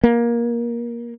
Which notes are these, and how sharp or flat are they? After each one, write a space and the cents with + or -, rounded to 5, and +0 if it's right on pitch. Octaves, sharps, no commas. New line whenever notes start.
A#3 +20